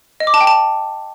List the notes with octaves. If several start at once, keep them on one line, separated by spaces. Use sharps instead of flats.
D#5
D6
A5
G5
A5